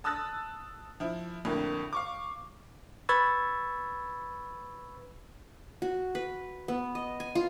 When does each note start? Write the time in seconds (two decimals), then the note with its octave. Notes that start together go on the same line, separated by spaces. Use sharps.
0.04 A5 D#6 E6 F#6 A6
1.00 F3 E4
1.45 F2 A2 D3 A#3
1.93 F5 C#6 D6
3.09 B4 B5 C#6 E6 G#6 A6
5.82 F#4
6.15 B4
6.68 B3
6.95 D#5
7.20 G#5
7.35 F4